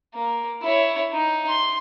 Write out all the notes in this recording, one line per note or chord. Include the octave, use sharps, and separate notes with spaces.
A#3
E4 C#5
D#4
C6